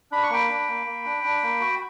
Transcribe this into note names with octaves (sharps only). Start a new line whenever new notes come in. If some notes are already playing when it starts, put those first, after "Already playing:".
D4 B5
C#6
A#3 G5 B5
D4
A#3
A#3
D4
D4
A#3
F#4